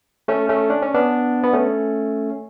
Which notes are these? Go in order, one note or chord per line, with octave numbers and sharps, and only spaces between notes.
A3 C#4
A3 C#4
D4
C#4
B3 D4
B3
A3 C#4